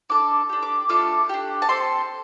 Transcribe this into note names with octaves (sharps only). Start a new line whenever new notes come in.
D4 A4 D6
D4 G4
D6
A3 D4 F4 A4 D6
D4 G4
A5
C4 A4 C6